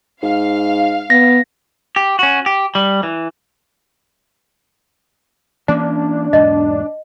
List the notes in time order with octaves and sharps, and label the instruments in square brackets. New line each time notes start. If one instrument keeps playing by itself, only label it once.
[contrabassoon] G#2 [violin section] F5
[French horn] B3 [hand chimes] A#6
[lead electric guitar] G4
C#4 F#4
G4
G3
E3
[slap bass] E3 A#3 C#4 [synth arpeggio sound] D4
[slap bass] E2 G#2 B2 [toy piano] D#5